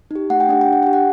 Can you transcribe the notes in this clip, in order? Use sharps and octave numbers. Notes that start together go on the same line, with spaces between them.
D#4 G4
A3 F#5
G5
D4 G4 F#5
G5
D4 F#5
G4 G5
F#5